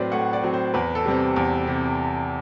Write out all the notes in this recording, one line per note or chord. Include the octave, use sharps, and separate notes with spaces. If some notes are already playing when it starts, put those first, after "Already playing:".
Already playing: A2 F#3 C4 B4 C5 D5
A2 F#5
D5
F#3 C4
C5
E2 B4
A4
C3 G3 C4 G4
E2
C3